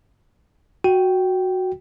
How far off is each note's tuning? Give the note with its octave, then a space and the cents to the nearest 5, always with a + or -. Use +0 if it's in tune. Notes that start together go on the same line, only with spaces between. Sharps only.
F#4 +0 G5 -10